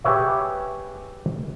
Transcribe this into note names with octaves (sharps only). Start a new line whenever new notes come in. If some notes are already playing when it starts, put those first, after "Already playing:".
G4 G#4 B4 C#5 E5